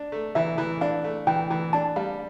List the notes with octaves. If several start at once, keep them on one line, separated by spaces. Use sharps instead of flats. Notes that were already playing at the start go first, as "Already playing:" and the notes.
Already playing: D4
A3
E3 E5
E3
D4 F5
A3
E3 G5
E3
D4 A5
G3 F5